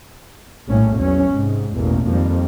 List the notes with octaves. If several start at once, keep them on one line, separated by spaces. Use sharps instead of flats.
A#1 A2 G3 C#4
E2 F#3 C#4
G#2 C3
A1 E2 B2 A#3
F2 D#3 F3 G3 A#3